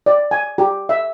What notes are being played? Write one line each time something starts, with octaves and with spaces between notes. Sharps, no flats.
D5
G#5
G4
E5